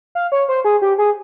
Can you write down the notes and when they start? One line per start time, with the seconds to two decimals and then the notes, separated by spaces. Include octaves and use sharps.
0.15 F5
0.32 C#5
0.49 C5
0.65 G#4
0.82 G4
0.98 G#4